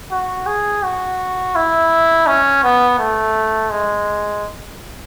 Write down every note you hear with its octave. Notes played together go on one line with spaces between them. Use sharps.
F#4
G#4
F#4
E4
C#4
B3
A3
G#3